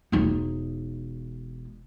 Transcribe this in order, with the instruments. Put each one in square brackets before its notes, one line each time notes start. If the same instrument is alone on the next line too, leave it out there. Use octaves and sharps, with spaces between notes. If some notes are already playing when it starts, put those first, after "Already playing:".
[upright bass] E1 D#4